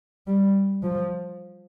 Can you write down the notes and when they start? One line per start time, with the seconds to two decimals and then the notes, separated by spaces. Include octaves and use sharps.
0.27 G3
0.83 F3